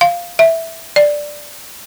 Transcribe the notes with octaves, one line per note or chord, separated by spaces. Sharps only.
F5
E5
D5